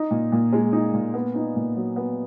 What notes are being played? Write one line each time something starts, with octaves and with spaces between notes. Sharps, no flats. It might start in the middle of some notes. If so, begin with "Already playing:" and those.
Already playing: D#4
A#2
A#2
G#3
D#4
A#2
B3
D#4
A#2
F#3
B3